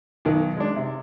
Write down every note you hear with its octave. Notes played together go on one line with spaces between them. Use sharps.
B1 D#3
G#3 D4
C3